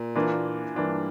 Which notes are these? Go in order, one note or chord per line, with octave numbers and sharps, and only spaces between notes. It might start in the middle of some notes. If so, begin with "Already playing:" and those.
Already playing: A#2
E3 A#3 D4 F4
G2 E3 A#3 D4 F4